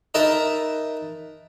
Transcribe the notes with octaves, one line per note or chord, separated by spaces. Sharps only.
D#4 A#4 B4 E5 A5